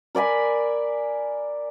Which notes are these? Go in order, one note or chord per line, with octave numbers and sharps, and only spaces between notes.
A#4 D5 G#5 B5